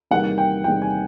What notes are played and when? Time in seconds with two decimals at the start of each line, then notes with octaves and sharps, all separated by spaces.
0.11 E2 C3 D#3 G3 A#3 F#5
0.38 G5
0.64 E2 C3 D#3 G3 A#3 G5
0.82 G#5